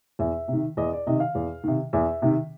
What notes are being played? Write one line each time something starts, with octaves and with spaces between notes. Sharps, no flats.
E2 E5
C3 D#3
E2 D#5
D5
C3 D#3 D#5
F5
E2
C3 D#3
E2 E5
C3 D#3